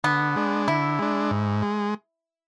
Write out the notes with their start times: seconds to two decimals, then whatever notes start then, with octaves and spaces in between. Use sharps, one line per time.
0.04 D3 B3
0.36 G#3 D4
0.68 D3 E4
0.99 G#3 D4
1.31 G#2
1.63 G#3